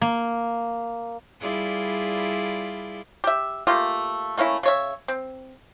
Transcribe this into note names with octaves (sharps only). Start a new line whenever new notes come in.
A#3
G3 E4 F4 G#4 B4 D5
G4 E5
A3 A#3 F4 G4
A3 A#3 C#4 E4
C#3 C#5 E5
C4